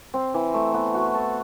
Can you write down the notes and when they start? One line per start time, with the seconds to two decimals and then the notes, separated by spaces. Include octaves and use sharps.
0.14 C4
0.34 E3
0.54 A3
0.74 B3
0.94 F#4
1.14 A4